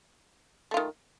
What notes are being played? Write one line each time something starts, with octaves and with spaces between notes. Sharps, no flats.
D#3 A3 F4